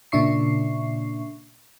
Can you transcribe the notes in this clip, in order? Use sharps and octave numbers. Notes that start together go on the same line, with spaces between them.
A#2 C#3 D4 E5 C#6 C7